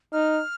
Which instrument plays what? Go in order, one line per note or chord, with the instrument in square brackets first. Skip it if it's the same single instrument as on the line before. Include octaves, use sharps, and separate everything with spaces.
[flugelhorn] D#4 [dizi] F6